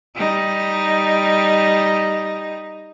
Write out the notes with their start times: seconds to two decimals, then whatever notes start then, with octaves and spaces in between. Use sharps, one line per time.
0.15 G3 D#4